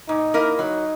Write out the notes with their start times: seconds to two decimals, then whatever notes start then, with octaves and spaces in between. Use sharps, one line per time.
0.09 A#2 D#4
0.34 A#3 E4 A#4 D#5
0.59 F#3 D#4